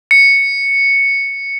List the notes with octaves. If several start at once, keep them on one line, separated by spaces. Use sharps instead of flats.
C#7